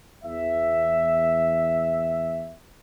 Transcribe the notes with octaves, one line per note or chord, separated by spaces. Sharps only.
E2 E5